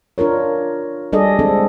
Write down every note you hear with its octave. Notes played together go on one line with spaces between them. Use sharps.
D4 F4 A#4 C#5
G3 D4 G#4 A4 D5 D#5
G#3 C4 D4 A4